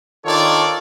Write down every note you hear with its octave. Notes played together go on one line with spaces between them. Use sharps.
D#3 D4 F4 A4 C#5 D5